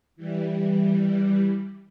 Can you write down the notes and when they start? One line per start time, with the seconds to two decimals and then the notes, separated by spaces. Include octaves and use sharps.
0.16 E3 G3